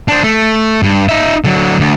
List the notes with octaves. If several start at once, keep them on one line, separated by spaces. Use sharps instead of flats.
D4 C5
A3
G2
D#4 E5
D3 F#3
D2